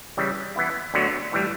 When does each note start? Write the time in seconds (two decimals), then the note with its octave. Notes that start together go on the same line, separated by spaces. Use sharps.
0.17 C#3 E3 G3
0.56 E3 B3 E4
0.94 D2 D3 F#3 B3 F#4
1.32 A2 E3 G3